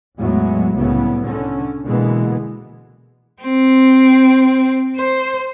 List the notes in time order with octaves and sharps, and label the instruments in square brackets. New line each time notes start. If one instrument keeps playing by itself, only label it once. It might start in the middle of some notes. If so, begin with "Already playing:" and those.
[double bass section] E2 A2 F#3 G#3 B3
C2 A2 C#3 F#3 B3
D3 C#4
B2 D3 E3 G#3 A#3 B3
[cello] C4
C5